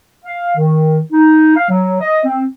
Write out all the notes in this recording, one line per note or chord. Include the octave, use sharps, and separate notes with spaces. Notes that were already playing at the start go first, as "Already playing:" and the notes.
F5
D#3
D#4
F5
F#3
D#5
C4